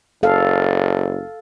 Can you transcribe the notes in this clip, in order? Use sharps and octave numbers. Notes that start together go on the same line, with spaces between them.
F#1 A4 F5